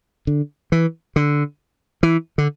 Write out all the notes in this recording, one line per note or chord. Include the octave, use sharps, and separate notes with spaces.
D3
E3
D3
E3
D3